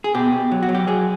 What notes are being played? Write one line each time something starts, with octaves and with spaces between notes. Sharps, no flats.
G#4
B2 G4
B2
F#3
F#4
F#3
G4
F#3 G#4